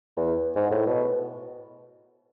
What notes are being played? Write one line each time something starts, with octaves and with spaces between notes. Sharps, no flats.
E2
G#2
A2
B2